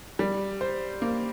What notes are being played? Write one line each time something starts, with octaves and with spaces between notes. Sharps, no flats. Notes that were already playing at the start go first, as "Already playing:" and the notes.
G3
C5
A#3